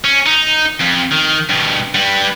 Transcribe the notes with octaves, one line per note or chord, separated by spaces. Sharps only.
C#4
D#4
F2
D#3
G2 B2
G3 B4